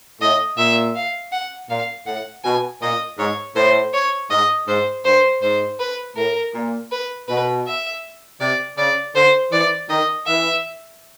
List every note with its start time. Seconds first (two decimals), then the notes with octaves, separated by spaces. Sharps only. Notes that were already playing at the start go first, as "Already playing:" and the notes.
0.21 A2 D#5
0.58 A#2 E5
0.95 F5
1.32 F#5
1.70 A#2 F5
2.07 A2 F#5
2.44 B2 G#5
2.82 A#2 D#5
3.19 G#2 C#5
3.56 A2 C5
3.94 C#5
4.31 G#2 D#5
4.68 G#2 C5
5.05 G2 C5
5.42 G#2 C5
5.80 B4
6.17 A2 A#4
6.55 A#2
6.92 B4
7.28 B2 B4
7.67 E5
8.41 C3 D5
8.78 C#3 D5
9.15 D3 C5
9.52 E3 D5
9.90 D#3 D#5
10.27 E3 E5